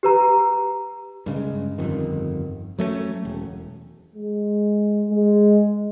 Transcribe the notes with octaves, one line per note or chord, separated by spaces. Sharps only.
G4 B4 A#5
G2 C#3 G#3
G1 F2 D#3
F#3 A3 B3 C#4
E1
G#3
G#3